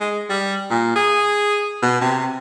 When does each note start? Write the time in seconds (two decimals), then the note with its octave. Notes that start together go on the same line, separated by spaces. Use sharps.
0.01 G#3
0.30 G3
0.70 A#2
0.96 G#4
1.82 B2
2.01 C3